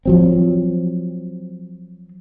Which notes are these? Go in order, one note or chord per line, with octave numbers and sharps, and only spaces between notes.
F3 F#3 C4